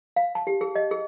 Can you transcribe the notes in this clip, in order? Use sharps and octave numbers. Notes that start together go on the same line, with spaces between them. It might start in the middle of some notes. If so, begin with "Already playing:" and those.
F5
A5
G4
G#4
D#5
G#4